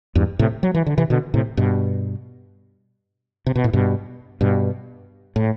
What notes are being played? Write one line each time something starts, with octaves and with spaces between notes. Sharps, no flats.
E2 G2
A2 C3
F#3
E3
D3
C3 E3
B2 D3
A2 C3
G2 B2
C3
B2
A2
G2 B2
G2 B2
A2